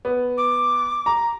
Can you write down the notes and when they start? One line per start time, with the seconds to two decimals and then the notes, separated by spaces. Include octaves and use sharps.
0.05 B3
0.37 D6
1.06 A#5